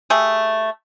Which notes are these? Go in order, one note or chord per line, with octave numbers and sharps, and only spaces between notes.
A3 G4 G#4